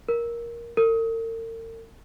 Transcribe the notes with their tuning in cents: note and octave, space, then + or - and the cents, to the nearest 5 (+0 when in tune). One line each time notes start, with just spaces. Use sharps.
A#4 +10
A#4 -45